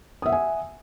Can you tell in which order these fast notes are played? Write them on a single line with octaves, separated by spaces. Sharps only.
D#6 E5 F#5 G#5